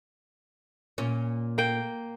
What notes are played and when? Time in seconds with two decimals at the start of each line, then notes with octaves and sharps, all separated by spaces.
0.98 A#2 C#4
1.58 A#3 G5